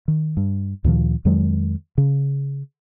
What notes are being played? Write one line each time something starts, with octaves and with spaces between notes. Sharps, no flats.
D#3
G2
D2 A#2 D#3 F3
F2 D#3 F#3 G#3
C#3